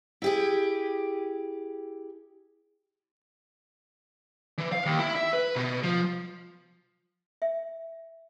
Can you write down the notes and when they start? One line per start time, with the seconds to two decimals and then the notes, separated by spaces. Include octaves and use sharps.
0.22 E4 G4 G#4
4.58 E3
4.72 F5
4.86 D#2
4.99 E4
5.15 E5
5.33 B4
5.56 B2
5.83 F3
7.42 E5